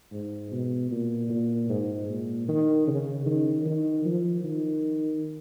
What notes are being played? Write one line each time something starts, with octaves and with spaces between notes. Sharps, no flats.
G#2
B2
A#2
A#2
G#2
A#2
D#3
C#3
D#3
D#3
F3
D#3